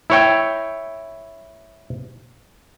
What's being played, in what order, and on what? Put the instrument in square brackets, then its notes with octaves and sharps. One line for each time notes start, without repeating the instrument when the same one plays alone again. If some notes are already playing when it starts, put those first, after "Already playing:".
[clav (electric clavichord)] E4 C#5 G5